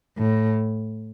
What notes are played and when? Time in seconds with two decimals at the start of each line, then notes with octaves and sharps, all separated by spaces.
0.18 A2